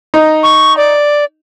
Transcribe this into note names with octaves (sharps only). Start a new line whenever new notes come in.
D#4
C#6
D5